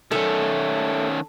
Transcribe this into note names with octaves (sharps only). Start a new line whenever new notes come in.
D#3 A3 C#4